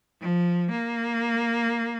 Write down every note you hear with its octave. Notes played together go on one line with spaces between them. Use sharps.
F3
A#3